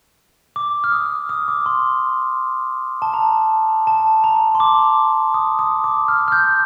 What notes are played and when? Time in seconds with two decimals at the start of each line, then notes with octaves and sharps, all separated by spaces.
0.56 D6
0.84 F6
0.92 D#6
1.29 D#6
1.48 D6
1.66 C6
3.02 A5
3.14 A#5
3.87 A5
4.24 A#5
4.55 C6
4.60 D6
5.34 D#6
5.59 D#6
5.84 D6
6.08 F6
6.28 F6
6.32 G6